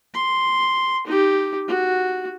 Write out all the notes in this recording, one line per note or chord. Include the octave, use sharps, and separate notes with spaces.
C6
D#4 G4
F#4